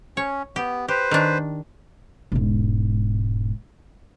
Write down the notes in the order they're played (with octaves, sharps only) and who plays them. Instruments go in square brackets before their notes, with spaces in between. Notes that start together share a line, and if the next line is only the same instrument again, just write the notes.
[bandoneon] C#4 [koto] C#5
[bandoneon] B3 [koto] G4
[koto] G4 [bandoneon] B4 C5
[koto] D#3 D4
[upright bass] E1 G#2